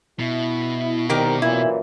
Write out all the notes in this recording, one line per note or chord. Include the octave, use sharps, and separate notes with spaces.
B2 E4
C2 D#3 G4 A#4
F#2 A#2 E3 E4